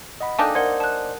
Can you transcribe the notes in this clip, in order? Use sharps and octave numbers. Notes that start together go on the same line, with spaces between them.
D#5 F#5 B5
A#3 D4 D#4 A4 G5 G#5
A#4 C5 D5 D#5 F#5 G#6
A5 F#6